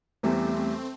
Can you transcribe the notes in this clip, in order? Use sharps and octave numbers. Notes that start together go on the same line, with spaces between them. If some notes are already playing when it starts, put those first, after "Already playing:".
E2 E3 G3 A3 C4